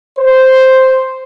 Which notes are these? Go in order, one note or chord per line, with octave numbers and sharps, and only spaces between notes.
C5